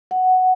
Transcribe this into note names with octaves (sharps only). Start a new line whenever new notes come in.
F#5